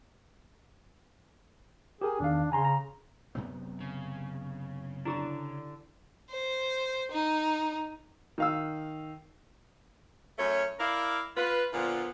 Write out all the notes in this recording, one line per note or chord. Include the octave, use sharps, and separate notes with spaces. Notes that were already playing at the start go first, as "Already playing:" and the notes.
G4 G#4 A#4 G#5
E2 D#3 D4 F5
C#3 G#5 A#5 C6
A#5
F#2 C3 B3
C#3
D3 D4 E4 G4 A#5
C5
D#4
D#3 F5 E6
F#2 A3 C#4 C#5
E4 A#4 D5 F5
F4 B4
A#2 D3 F3 B3 F4